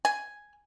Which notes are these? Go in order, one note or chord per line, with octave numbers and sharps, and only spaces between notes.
G#5